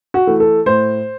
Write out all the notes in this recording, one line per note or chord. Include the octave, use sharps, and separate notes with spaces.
F#4
E3 A3
A4
A2 C5